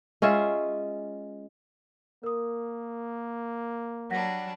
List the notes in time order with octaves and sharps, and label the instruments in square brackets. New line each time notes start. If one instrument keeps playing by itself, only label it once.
[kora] G#3 C#4 F4 E5
[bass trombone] A#3 [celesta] A#4 D#6
[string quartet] F#3 G3 D4 [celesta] F#5 A#6 B6